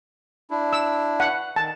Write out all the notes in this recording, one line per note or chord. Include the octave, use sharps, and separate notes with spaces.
D4 E4
E6
F#5
D#3 A5